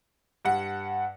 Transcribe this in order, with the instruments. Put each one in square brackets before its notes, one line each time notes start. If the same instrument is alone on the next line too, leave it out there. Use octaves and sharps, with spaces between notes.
[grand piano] G2 F#5